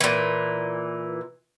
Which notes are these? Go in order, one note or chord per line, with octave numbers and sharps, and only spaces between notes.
A#2 E3